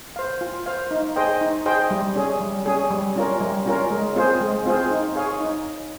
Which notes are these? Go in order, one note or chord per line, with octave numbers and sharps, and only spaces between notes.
C5 F5
F4
C5 F5
D#4
G#4 C5 D#5 G5
D#4
G#4 C5 D#5 G5
G3
C#4 G#4
G3
C#4 G#4
G3
C#4 F4 A#4
G3
C#4 F4 A#4
G#3
C4 F4 G#4 C5
G#3
C4 F4 G#4 C5
D#4
G#4 C#5 F5
D#4